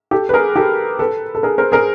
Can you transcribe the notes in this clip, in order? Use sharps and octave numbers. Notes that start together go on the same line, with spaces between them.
G4 A4
B4
G#4 A#4
G4 A4
A4 B4
A4
G#4 A#4
A#4 C5
G#4 A#4